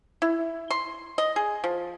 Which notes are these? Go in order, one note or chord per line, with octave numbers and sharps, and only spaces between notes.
E4
C6
D#5
G#4
F3